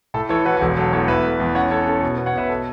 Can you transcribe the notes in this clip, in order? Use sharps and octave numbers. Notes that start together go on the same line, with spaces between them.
A2 A4
E3 A4 C#5
E3 F#4 B4
F#4
E1 A4
F#3 A4
E2 A4 C#5
E2 B4 E5
A3
E2
C#4 C#5 F#5
C#4 A4 C#5
C#4 A4
B2
B3
C#5 F#5
B2 B4 E5
A4